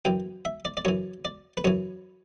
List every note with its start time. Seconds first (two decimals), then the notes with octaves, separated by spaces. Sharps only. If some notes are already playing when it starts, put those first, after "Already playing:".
0.05 F#2 E3 G5
0.45 E5
0.65 D5
0.77 D5
0.85 F#2 E3 C#5
1.25 D5
1.57 B4
1.64 F#2 E3 C#5